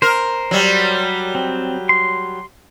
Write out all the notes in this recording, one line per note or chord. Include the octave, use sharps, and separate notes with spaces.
A#4 C5
F#3 G3
C4
C6